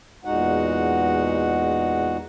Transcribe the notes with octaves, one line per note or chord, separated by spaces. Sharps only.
E2 A#2 G#3 D#4 F#4 F#5